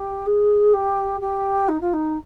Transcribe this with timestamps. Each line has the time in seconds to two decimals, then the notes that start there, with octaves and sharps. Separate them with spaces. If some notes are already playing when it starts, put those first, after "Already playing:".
Already playing: G4
0.26 G#4
0.73 G4
1.20 G4
1.68 D#4
1.80 F4
1.93 D#4